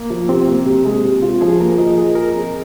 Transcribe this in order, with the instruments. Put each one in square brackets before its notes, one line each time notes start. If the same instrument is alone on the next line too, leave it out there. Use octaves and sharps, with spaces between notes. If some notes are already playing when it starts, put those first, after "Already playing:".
Already playing: [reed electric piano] A#3
[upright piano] F3
[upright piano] C3 [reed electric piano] C4
[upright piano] A#3
C3
G#3
C3
F4
[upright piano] F3 [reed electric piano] G#4
[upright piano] A#3 [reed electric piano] A#4
[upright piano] F3 [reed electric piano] D#5
[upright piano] G#4
[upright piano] G#4 [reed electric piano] A#4
[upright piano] C4